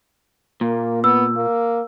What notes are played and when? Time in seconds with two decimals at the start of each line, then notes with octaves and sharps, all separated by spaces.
0.61 A#2 A#3
1.04 B3 E6
1.36 A#3